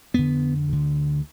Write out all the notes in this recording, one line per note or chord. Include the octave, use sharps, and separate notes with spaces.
F2 D3 B3
D2 D3